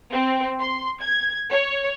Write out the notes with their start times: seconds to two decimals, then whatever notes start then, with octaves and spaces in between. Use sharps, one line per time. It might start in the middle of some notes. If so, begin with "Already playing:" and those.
0.12 C4
0.59 C6
1.01 G#6
1.51 C#5